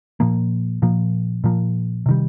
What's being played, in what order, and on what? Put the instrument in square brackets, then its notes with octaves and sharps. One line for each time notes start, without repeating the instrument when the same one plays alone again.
[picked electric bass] A#2 F3 A#3
A#2 F3 A#3
A#2 F3 A#3
C3 D#3 G3